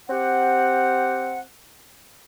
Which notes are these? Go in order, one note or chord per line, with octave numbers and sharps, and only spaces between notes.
C4 G4 F#5